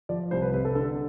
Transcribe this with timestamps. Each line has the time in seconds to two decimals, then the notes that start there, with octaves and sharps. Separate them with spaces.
0.09 F3 D5
0.31 C2 C5
0.42 B4
0.53 C3 B4
0.65 A4
0.75 D3 A4